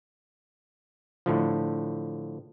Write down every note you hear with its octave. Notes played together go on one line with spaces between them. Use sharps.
A2 D3 F3